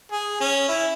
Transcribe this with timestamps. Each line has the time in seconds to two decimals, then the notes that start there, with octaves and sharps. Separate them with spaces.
0.12 G#4
0.41 C#4
0.69 E4